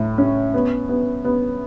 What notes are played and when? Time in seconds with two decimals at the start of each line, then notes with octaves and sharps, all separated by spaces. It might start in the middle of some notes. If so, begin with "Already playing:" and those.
Already playing: A2
0.18 C#4
0.54 B3
0.89 B3
1.25 B3